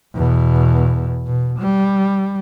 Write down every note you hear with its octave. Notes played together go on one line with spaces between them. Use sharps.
E2 B2
B2
G3